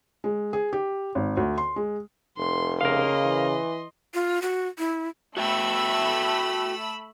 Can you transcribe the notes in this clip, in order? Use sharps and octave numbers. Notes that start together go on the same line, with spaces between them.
G#3
G#4
G4
G#1
D2
C6
G#3
F1 C6
C#3 A#4 D#5 F5 C6
E3
F4
F#4
E4
A3 F#4 E5 G5 B5 E6